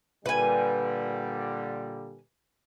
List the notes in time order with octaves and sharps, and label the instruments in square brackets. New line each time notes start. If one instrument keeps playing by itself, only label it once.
[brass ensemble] A#2 D3 G3 [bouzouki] B4 G#5